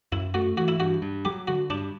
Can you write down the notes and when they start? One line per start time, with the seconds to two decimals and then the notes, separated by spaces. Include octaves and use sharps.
0.12 F#2 E4
0.34 A3 F#4
0.57 E3 F#4
0.68 E4
0.79 G2 F#4
1.02 G2
1.25 F#3 G4
1.48 D3 F#4
1.70 G2 D4